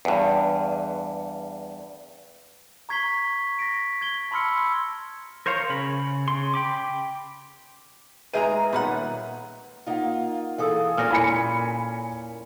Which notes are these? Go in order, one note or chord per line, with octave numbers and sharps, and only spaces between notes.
E2 G2
A#5 C#6 G#6 B6 C7 G7
A#6 B6 D7
G#6 G7
A5 B5 C6 E6 F6 C#7
A#4 C5 C#5 F5 A#5
C#3 B5
C#3 C6
G5 B5 D6
D#3 G#3 A#3 G#4 B4 E5 A#5 D#7
D#1 A#2 F3 D#4 F#5 B5
A#3 D#4 F4 F5 F#5
E3 G#4 A4 F5 D#6 E6
A#2 A#3 C#4 A4 F6 A#6
E4 G#5 B5 C#7